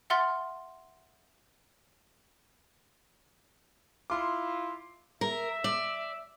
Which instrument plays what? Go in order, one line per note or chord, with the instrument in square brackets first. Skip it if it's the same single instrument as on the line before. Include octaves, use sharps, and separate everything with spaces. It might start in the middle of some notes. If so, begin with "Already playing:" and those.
[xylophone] E5 F#5 C6 F6 A6
[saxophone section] E4 F4 [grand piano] C6 D6
[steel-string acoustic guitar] A#4 [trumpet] E5
[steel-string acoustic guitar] D5